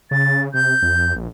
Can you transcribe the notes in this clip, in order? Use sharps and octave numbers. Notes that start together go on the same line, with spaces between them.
C#3 A6
C3 G6
F2
A#1